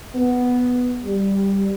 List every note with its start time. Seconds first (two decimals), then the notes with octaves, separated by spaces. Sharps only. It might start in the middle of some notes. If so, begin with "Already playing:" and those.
0.16 B3
1.06 G3